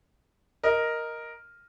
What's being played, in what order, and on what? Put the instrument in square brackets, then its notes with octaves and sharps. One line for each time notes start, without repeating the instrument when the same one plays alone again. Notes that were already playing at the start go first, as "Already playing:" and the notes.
[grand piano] A#4 D#5